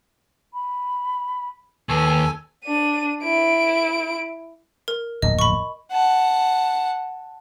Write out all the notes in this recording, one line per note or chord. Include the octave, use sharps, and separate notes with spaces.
B5
D#2 A4 B4 G#5
D4 D#7
E4 D7
A#4
D1 A#1 F2 D#5
B5 C#6
F#5 A5